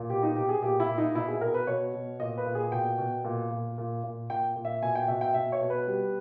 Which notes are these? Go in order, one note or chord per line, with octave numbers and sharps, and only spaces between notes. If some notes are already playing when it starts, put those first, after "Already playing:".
Already playing: A#2
B2 G4
D#4
B2 G4
G#4
A#2 G4
E4
A#2
D#4
B2 E4
G#4
B2 A#4
B4
B2 C#5
B2
A#2 D#5
B4
A#2
G#4
B2 G5
B2
A#2
A#2
A#2
A#2
A#2 G5
A#2
E5
B2 G#5
G5
B2 E5
G5
B2 E5
C#5
B2
B4
G3